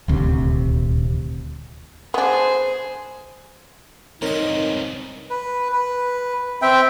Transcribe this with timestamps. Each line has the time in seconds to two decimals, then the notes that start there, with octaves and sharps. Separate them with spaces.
0.08 D#1 D2 C3
2.14 B3 D4 G#4 C5
4.22 C#2 G2 C4 D#4 A#4 C#5 D#5
5.30 B4
5.72 B4
6.62 C4 E5 G5